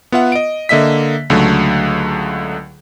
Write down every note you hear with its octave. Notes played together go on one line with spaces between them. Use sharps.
B3 F4 E5 F#5
D#5 D7
D3 A#3 D#5 E5 B6
C#2 D3 F#3 A3